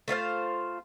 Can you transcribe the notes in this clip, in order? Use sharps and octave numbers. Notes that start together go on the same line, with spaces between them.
A3 F4 C5 F5